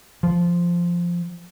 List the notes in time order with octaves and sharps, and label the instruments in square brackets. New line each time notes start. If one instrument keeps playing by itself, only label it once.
[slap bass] F3